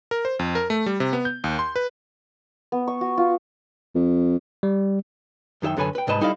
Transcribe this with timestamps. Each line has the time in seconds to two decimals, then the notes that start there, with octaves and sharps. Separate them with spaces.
0.11 A#4
0.25 C5
0.39 F2
0.55 A#4
0.70 A3
0.86 G3
1.00 C3
1.13 B3
1.25 G6
1.44 D#2
1.59 C6
1.76 B4
2.72 B3
2.87 C#6
3.01 F#4
3.18 F4
3.95 F2
4.63 G3
5.62 F#2 D#3 G4 E5 G5
5.77 F#2 D3 A4 B4 C#5 G#5
5.95 B4 G5
6.07 C2 G#2 B4 D#5 A5 B5
6.21 G3 D#4 E4 A4 D#5 F5